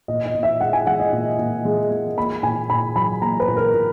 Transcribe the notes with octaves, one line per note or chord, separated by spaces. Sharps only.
A#2 D#5
D#5
A#2
E5
G#3 F#5
G#5
G#3 F#5
D#5
A#2
A#2
G#3
G#3
A#3 B5
A#2 G#5
A#2 B5
F#3 B5
A#3 A#5
B4
A#2
A#4
A#2